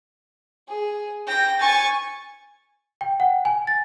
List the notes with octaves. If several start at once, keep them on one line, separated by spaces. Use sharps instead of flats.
G#4
G5 A#6
G#5 C#6 A6
G5
F#5
G#5
A6